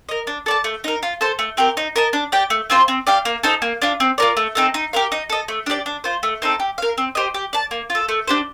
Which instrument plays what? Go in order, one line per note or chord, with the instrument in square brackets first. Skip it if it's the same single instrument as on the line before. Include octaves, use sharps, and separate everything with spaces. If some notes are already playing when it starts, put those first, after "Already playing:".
[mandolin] A#4 D#5
D4
A4 D5 A5
A3
D#4 A#4
F4
A4 C5
A3
C4 G4 A#4
D#4
A#4 D#5 A5
D4
G4 D5 G5
A3
C4 F4 C5
C4
G4 D5 F5
A#3
D#4 A4 C5
A#3
D4 F4
C4
F4 A#4 D5
A3
C4 D#4 A4
D#4
G4 A#4 F5
D#4
A4 D#5
A3
D4 G4 D5
D4
F4 C5
A3
C4 D#4 A4
G4
A#4 F5
C4
G4 C5 D#5
G4
D5 A5
A#3
F4
A4
A3
D4 G4 C5